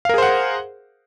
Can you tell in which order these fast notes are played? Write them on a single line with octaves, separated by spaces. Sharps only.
F5 A#4 G#4 C5 F#5